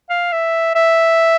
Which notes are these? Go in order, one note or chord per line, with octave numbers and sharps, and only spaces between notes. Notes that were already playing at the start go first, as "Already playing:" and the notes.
F5
E5
E5